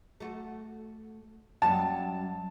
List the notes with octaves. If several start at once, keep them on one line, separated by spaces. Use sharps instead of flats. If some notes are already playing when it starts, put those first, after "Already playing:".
A3 F#4
F#2 F#3 G3 A5